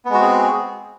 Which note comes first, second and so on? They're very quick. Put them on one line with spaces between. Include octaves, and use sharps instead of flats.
B3 G#3 F#4 C4 G#4